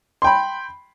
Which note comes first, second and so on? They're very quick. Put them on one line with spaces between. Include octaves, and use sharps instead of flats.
C6 G5 B5